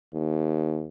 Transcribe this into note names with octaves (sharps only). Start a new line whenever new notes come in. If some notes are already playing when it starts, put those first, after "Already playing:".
D#2